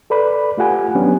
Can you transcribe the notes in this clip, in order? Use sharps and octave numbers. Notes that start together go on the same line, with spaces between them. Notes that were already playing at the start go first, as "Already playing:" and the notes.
A4 B4 D5 B5
A3 F4 G4 F#5 G#5
F#3 B3 C#4 D4 G4